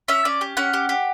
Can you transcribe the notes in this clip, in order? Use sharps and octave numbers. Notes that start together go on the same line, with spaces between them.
C#4 E5
C#4 D5
G4
C#4 F#5
G4
G4